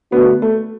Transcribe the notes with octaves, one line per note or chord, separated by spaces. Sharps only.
D3 A3 B3 D4 F#4
A3